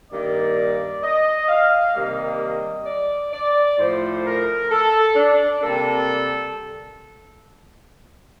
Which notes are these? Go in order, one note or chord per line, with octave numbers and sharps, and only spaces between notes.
G2 D#3 A#3 D5
D#5
F5
C3 D#3 G3 A#3 D#5
D5
D5
A2 F3 A3 C5
A#4
A4
D4
C3 G3 A#3 A4